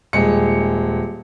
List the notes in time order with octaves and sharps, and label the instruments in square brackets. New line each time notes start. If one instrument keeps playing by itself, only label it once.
[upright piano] D#1 G#3 C#7